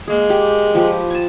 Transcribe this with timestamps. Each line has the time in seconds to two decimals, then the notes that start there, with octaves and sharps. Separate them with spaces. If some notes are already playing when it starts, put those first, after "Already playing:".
0.08 G#3 A#3 G#4
0.30 G4
0.75 F3 G4 B4
1.10 G#5 A5